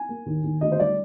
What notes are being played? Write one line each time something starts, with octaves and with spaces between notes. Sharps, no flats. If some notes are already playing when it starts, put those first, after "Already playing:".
Already playing: G#5
A#3
D#2
D#2
D2 D#5
C5
G3 D5